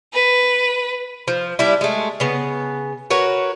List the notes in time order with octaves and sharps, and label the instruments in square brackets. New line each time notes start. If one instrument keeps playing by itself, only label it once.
[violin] B4
[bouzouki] F3
G3 D4 E4
G#3 A3
C#3 B3
F#4 A#4 B4 C#5